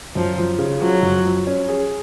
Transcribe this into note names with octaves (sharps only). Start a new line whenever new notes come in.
F#2 F3
F3
C#3
F3 F#3
F#2
F3
C#4
G#4